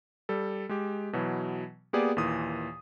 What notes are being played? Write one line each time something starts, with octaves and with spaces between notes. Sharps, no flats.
G3 A4
G#3 G4
B2 E3 F#3
A#3 B3 G4 G#4 D5
D#2 A#2 E3 D#6